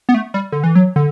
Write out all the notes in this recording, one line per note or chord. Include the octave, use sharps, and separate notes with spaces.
B3
A3
G3
D3
E3
F#3
D3